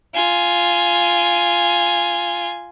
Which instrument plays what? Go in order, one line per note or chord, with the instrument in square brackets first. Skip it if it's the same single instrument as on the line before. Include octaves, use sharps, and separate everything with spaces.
[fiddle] F4 G#5